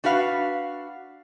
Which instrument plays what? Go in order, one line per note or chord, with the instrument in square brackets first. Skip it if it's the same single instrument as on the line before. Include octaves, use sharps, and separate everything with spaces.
[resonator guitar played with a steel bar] D4 F#4 B4 F5